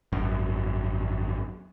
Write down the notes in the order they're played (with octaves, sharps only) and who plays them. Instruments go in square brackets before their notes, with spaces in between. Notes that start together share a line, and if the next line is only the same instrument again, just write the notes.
[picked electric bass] G#1 F#2